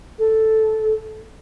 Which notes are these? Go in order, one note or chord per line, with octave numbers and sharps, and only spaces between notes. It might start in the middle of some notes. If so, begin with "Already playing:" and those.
A4